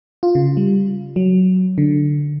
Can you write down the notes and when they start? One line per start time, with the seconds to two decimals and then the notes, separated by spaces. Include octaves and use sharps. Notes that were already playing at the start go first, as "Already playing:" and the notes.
0.23 F4
0.35 C#3
0.57 G3
1.16 F#3
1.78 D3